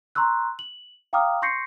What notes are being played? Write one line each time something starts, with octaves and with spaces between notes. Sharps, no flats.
A#5 C6 C#6 E6 F#6
F#7
F5 G5 A#5 D6 D#6 F6
C6 C#6 G6 A#6 C7 C#7